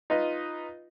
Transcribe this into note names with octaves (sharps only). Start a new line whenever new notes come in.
D#4 F4 B4 D#5